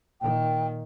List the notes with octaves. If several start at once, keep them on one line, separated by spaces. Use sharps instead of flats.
A#2 D#3 G5